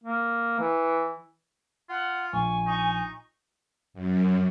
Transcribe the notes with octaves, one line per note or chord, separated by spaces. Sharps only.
A#3
E3
F4 F#5
A#1 G#5 C#6
D#4 C#6
F#2